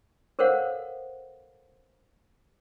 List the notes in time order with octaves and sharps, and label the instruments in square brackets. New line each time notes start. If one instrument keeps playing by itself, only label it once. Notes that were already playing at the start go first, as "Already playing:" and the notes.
[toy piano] A4 A#4 C5 C#5 F5 F#5